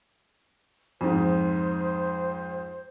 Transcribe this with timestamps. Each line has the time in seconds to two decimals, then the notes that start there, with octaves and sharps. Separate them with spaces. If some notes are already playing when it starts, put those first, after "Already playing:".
1.01 F2 G#2 C5